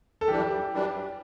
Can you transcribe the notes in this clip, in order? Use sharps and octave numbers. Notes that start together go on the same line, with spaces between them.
A4
F#2 E3 G3 D4 G4
F#2 E3 G3 D4